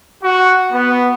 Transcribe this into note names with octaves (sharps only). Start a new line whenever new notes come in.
F#4
B3